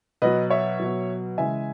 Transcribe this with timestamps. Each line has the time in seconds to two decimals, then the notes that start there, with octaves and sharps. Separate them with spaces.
0.22 B2 F#3 B4 D#5
0.50 C#5 E5
0.80 B2 F#3
1.38 C#3 E3 G#3 E5 G#5